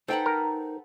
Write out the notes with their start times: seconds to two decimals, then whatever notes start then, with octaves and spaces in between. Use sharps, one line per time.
0.08 D#4 A4 B4 C5 F#5 G5 A#5
0.26 A#4